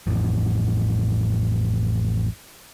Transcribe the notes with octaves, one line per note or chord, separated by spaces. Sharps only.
A1 F2 A2